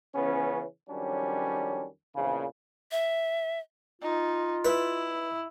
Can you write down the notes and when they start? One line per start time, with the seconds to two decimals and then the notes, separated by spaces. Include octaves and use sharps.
0.15 C#3 E3 F3 B3 C#4
0.89 F2 D#3 F#3 G3 C#4 D4
2.16 A#1 E2 C#3
2.91 E5
4.02 D#4 F4
4.65 E4 B4